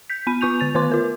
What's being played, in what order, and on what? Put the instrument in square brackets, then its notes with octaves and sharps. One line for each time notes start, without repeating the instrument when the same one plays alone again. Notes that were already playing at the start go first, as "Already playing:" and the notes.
[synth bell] G6 B6
B3 B5 D#7
B3 F4 C#6 G6 F7
D3 A6 F7
D#3 B3 B4 C6 D6
F4 A#4